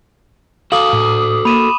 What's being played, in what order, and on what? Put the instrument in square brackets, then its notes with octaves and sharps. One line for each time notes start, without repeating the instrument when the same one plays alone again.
[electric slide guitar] F#4 A4 A5 [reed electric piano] F5 [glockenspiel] D6 D#6 F#7
[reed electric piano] A2
[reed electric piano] A#3 [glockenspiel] B5 D#7 E7